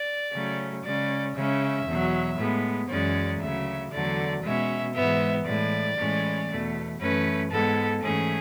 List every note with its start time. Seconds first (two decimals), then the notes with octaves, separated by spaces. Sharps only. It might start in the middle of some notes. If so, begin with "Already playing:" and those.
Already playing: D5
0.33 C#3 F#3 A3 C#4
0.84 C#3 G#3 C#4 D5
1.35 C#3 G#3 C#4 E5
1.86 E2 B2 F#3
2.38 A2 G#3 B3
2.89 F#2 E3 G#3 C#4 D5
3.40 D2 C#3 F#3 E5
3.92 E2 D3 F#3 A3 D5
4.43 B2 G#3 C#4 E5
4.94 G#2 E3 G#3 B3 E5
5.45 A2 E3 G#3 D5
5.97 A2 E3 G#3 C#4
6.49 E2 B2 A3
7.00 F#2 E3 A3 C#4 B4
7.51 G#2 G#3 B3 A4
8.02 G#2 E3 A3 C#4 G#4